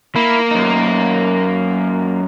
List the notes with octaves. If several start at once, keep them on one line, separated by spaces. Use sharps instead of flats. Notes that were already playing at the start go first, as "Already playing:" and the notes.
A#3 E4
F#2 D#4